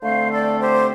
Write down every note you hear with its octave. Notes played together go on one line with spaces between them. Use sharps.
D3 A3 C4 C5 F5
A4 D5
G4 C5